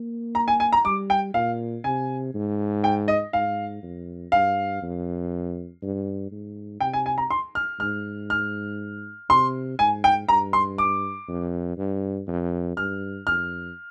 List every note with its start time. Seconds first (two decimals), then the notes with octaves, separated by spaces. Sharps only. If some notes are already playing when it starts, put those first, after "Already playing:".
Already playing: A#3
0.35 A#5
0.48 G#5
0.60 G#5
0.72 A#5
0.85 G3 D6
1.10 G5
1.34 A#2 F5
1.84 C3 G#5
2.34 G#2
2.84 G5
3.08 D#5
3.33 G#2 F5
3.83 F2
4.32 G2 F5
4.82 F2
5.82 G2
6.31 G#2
6.80 C3 G5
6.93 G#5
7.06 G#5
7.18 A#5
7.31 C6
7.55 F6
7.80 G#2 F6
8.30 F6
9.30 C3 C6
9.79 G#2 G#5
10.04 G5
10.28 G2 A#5
10.53 C6
10.78 D6
11.28 F2
11.77 G2
12.27 F2
12.77 G2 F6
13.26 F2 F6